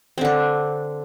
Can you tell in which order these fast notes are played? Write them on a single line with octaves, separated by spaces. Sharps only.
C4 D3 D4